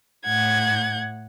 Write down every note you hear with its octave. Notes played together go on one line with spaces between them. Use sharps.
A2 F#5 G#6